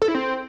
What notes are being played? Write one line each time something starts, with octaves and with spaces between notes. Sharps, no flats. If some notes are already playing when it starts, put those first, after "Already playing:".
A4
E4
C4